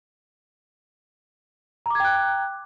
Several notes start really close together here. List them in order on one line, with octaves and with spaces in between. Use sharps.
A#5 D6 G#6 G5 F#6